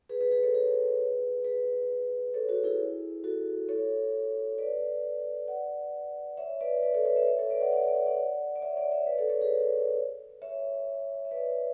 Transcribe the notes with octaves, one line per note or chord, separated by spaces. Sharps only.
G#4 B4
G#4 B4
G#4 B4
A4 C#5
G#4 B4
G#4 B4
A4 C#5
F#4 A4
E4 G#4
F#4 A4
A4 C#5
B4 D5
D5 F#5
C#5 E5
B4 D5
B4 D5
A4 C#5
B4 D5
C#5 E5
C#5 E5
A4 C#5
B4 D5
D5 F#5
D5 F#5
B4 D5
D5 F#5
D5 F#5
D5
C#5 E5
D5 F#5
C#5 E5
B4 D5
A4 C#5
A4 C#5
G#4 B4
C#5 E5
E5
B4 D5